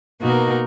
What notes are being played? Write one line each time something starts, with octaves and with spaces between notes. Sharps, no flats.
B2 A#3 D#4 F#4 A#4